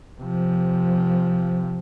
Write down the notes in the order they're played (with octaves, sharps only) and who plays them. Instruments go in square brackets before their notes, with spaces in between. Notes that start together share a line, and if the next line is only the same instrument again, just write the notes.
[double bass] C3 F3